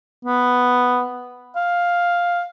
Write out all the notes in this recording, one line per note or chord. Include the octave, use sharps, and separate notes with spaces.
B3
F5